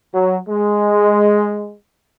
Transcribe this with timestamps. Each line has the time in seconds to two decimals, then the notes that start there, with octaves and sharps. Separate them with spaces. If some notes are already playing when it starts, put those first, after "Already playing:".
0.12 F#3
0.48 G#3